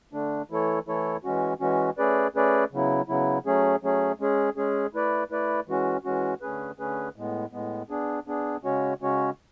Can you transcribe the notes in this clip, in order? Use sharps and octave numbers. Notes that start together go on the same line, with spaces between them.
D3 A3 D4
E3 A3 E4 A4 C#5
E3 A3 E4 A4 C#5
E3 G#3 C#4 F#4
E3 G#3 C#4 F#4
A3 C#4 G#4 B4 D5
A3 C#4 G#4 B4 D5
C#3 F#3 B3 E4
C#3 F#3 B3 E4
F#3 A3 C#4 G#4
F#3 A3 C#4 G#4
G#3 C#4 G#4
G#3 C#4 G#4
A3 E4 B4 D5
A3 E4 B4 D5
E3 G#3 C#4 F#4
E3 G#3 C#4 F#4
D3 A3 C#4 G#4 B4
D3 A3 C#4 G#4 B4
A2 G#3 B3
A2 G#3 B3
B3 D4 G#4
B3 D4 G#4
C#3 G#3 C#4 F#4 C#5
C#3 G#3 C#4 F#4 C#5